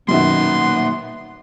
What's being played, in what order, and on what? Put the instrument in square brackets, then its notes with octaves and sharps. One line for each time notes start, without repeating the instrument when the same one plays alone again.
[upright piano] F#2 B2 D#3 [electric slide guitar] A#3 D#4 E5 [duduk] B3 [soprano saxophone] C6